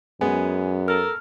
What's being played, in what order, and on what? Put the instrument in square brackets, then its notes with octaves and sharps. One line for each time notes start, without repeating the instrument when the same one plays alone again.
[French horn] F#2 [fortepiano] G#3 B3 [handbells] G#5
[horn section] A4 A#4 [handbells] F6